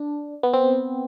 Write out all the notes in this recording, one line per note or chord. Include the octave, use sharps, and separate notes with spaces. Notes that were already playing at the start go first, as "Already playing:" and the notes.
Already playing: D4
B3
C4